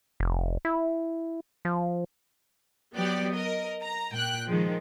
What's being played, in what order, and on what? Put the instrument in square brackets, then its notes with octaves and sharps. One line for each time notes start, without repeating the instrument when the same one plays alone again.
[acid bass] F1
E4
F3
[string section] F#3 B3 G4 D5
A#4 D#5
A#5
A#2 G5 F#6
D#3 F3 G#3